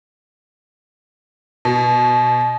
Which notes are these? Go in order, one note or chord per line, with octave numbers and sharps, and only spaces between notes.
B2